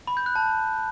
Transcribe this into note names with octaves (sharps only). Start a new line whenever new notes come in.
B5
G6
F#6
A5